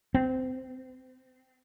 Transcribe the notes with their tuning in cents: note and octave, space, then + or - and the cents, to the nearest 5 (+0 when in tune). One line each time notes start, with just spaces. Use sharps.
C4 -25